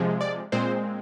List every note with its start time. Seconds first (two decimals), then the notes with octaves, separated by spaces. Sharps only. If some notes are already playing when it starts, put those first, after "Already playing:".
Already playing: C3 F3 G#3
0.21 D5
0.52 A#2 G#3 C4 C5